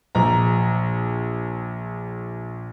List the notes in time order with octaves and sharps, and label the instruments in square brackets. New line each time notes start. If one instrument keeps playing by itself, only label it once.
[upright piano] A#1 A#5